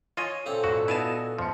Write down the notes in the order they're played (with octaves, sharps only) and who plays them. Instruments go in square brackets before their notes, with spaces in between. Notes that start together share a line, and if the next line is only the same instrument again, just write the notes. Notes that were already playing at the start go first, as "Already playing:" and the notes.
[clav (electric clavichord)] F4 D#5 G#5 [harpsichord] C#5
[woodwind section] A#2 A4 [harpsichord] C#3 C4 D5
[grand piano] G#1 [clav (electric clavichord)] F#4
[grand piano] B3 D#4 F#4 [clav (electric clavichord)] E4 G#5 A5 [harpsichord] F5
[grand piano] G1 C#2 C#7 [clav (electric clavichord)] F3